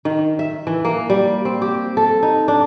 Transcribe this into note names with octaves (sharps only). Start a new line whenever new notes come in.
D#3
E5
E3
A#3
G3
C4
G4
A4
D#4
D4